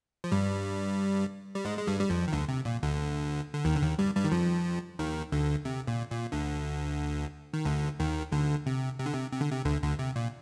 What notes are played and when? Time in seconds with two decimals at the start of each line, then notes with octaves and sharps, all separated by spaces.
0.24 F3
0.32 G2 G3
1.55 G3
1.65 G#2 G#3
1.79 G#3
1.87 G2 G3
2.00 G3
2.10 F2 F3
2.28 D#3
2.32 D2 D3
2.49 C3
2.65 A#2
2.83 D2 D3
3.54 D3
3.65 D#2 D#3
3.76 D3
3.82 D#2 D#3
3.99 G2 G3
4.16 G2 G3
4.24 D#3
4.32 F2 F3
4.99 D#2 D#3
5.32 D2 D3
5.65 C3
5.87 A#2
6.11 A#2
6.32 D2 D3
7.54 D#3
7.65 D2 D3
8.00 D#2 D#3
8.32 D2 D3
8.66 C3
8.99 C3
9.06 D3
9.13 C3
9.33 C3
9.41 D3
9.51 C3
9.65 D2 D3
9.83 D2 D3
9.99 C3
10.16 A#2